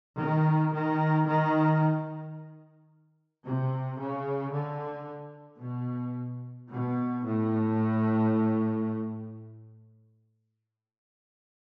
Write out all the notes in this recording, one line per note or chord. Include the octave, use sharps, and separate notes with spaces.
D#3
D#3
D#3
C3
C#3
D3
B2
B2
A2